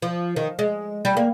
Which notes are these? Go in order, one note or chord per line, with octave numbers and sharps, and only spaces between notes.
F3
D#3
G#3
G3
A#3